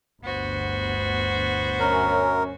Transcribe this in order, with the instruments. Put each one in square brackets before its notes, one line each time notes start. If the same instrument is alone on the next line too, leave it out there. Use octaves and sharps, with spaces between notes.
[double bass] G1 D2 [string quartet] B3 F#4 C5
[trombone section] F#2 C#4 [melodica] A#4